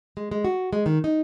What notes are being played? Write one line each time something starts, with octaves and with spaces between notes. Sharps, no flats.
G#3
G#3
F#4
G#3
D#3
D#4